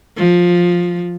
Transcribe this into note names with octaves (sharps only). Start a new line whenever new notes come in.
F3